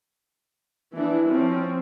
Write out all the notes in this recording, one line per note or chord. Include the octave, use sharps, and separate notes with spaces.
E3 B3 D4 E4
F3 C4 C#4